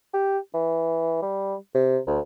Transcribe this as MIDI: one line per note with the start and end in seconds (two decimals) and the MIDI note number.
0.14 0.38 67
0.54 1.22 52
1.22 1.55 55
1.75 1.99 48
2.07 2.20 38